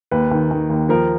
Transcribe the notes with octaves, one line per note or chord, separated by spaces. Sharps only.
D#2 B4
D#3
D#3
D#2
F3 A#4